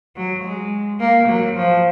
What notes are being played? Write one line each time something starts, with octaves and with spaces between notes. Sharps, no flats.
F#3
G#3
A#3
F#3
F3